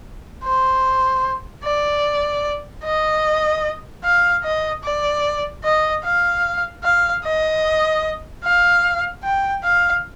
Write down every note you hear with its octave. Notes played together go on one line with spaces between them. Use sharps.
C5
D5
D#5
F5
D#5
D5
D#5
F5
F5
D#5
F5
G5
F5